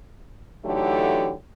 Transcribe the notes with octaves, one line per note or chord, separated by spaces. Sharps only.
D3 E3 F#3 A3 D#4 G4